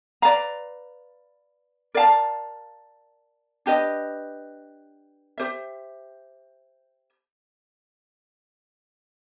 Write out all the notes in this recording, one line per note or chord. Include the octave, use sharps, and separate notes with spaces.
B4 D5 F5 A#5
A#4 D5 F5 A5
D4 G4 B4 D#5
G4 C5 E5